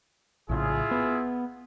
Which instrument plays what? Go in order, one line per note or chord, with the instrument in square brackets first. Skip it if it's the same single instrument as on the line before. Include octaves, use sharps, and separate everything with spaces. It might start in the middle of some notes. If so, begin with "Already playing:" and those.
[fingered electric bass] A#1 A2 C#3 [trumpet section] E4 F4 G#4
[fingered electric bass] B3